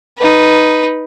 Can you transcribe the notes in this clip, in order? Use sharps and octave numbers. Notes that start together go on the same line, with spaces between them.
D#4 B4